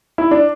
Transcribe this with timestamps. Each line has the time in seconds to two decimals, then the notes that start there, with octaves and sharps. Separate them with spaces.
0.18 E4
0.31 D4